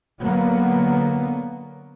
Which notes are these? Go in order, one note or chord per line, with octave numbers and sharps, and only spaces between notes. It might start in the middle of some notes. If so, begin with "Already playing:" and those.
D3 F#3 A#3 B3